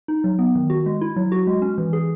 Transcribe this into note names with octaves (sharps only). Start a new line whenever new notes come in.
D#4
F#3
B3
D#3
F#4
G#3
E4
F#3
F#4
G#3
C#4
E3
G#4